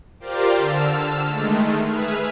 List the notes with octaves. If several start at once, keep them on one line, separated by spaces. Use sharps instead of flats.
F4 G4 A#4 C5 D5 F5
D3 A5 E6 F6
D#3 G#3 A3
G#4 B4 E5 F6